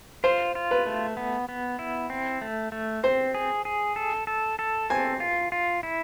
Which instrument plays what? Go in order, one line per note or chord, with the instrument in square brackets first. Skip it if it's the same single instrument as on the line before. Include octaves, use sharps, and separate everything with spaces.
[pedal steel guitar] F4 [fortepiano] C5
[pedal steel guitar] F4
[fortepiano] B4
[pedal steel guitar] A3
B3
B3
E4
C4
A3
A3
[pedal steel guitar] C4 [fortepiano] C5
[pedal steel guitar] G#4
G#4
A4
A4
A4
[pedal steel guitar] C4 [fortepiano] G#5
[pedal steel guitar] F4
F4
E4